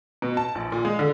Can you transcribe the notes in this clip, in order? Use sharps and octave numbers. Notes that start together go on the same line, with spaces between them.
B2
A5
A#1
A#2
G#3
D3